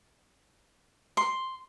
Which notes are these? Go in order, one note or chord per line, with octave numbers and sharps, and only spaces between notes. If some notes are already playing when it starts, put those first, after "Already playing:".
C6